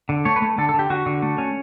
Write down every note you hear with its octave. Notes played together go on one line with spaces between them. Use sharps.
D3
A3 C#5
B4
A3
D3 A4
A4
D3 G4
D3 F#4
D3
A3
C#4